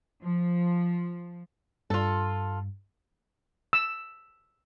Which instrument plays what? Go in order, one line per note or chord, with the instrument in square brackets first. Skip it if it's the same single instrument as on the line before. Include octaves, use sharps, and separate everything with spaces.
[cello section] F3
[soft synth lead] G2 [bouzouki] F4 A4
[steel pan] E6